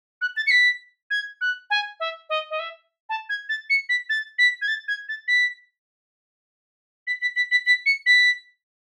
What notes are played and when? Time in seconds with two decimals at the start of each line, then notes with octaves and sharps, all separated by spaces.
0.21 F#6
0.37 A6
0.47 C#7
0.51 B6
1.11 G#6
1.41 F#6
1.70 G#5
2.00 E5
2.29 D#5
2.51 D#5
2.59 E5
3.09 A5
3.29 G#6
3.49 A6
3.70 C#7
3.89 B6
4.09 A6
4.39 B6
4.62 G#6
4.68 A6
4.88 G#6
5.09 A6
5.28 B6
7.07 B6
7.22 B6
7.36 B6
7.51 B6
7.66 B6
7.86 C#7
8.06 B6